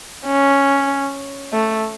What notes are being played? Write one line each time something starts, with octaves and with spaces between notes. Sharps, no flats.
C#4
A3